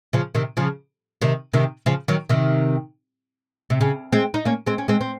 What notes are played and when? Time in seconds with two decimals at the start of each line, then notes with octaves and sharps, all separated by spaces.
0.13 C#3 F3
0.35 C3 D#3
0.57 C#3 F3
1.21 C3 D#3
1.53 C3 D#3
1.86 C#3 F3
2.08 D#3 F#3
2.29 C3 D#3
3.70 C3
3.81 C#3
4.12 G#3 C4
4.34 D#4
4.45 A#3 C#4
4.66 G#3 C4
4.78 C#4
4.88 G#3 C4
5.01 C4